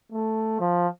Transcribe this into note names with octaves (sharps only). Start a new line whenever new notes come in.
A3
F3